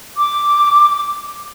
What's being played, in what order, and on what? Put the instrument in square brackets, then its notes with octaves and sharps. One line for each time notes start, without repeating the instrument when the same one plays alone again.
[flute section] D6